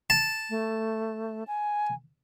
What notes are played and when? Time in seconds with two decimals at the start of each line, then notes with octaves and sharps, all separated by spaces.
0.10 A5
0.50 A3
1.47 G#5